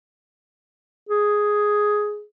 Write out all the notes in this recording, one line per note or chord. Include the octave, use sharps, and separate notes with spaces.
G#4